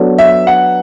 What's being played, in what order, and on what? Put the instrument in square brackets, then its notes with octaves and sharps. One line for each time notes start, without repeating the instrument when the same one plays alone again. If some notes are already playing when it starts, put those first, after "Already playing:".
Already playing: [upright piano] F#3 B3 D4 A4
[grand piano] E5
F#5